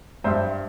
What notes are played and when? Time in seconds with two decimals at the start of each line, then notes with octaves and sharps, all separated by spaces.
0.24 G2 C5 E5